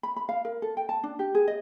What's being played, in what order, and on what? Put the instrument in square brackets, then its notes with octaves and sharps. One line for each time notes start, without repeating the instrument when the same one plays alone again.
[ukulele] B5
B5
F5
A#4
A4
G5
A5
D4
G4
G#4
D#5